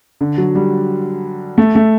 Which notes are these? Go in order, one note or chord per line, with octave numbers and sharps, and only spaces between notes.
D3
F#3
G3
A3
A3